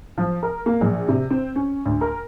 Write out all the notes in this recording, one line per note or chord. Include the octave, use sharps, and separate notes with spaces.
F3
A#4
A#3
A#1
C3
C4
C#4
D2
A#4